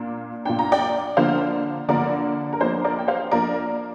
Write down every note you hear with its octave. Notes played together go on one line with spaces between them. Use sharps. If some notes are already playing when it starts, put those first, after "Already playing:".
Already playing: A#2 A#3 D4
A#2 A#3 D4 G5
A#5
D5 G5
D3 F3 A#3 D4 C5 F5
D3 F3 A#3 D4 A#4 D5
A#4
F3 A#3 D4 C5
A#4 D5
G5
C5 F5
F3 A#3 D4 A#4 D5